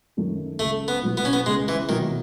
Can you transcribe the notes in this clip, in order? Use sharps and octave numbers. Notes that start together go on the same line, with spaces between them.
F#2 D#3 A3
C#2 A3
B3
B2 F#3 A3 E4
B3
C#4
B3
C#2 G#3
E3
B2 D#3 F#3 A3 E4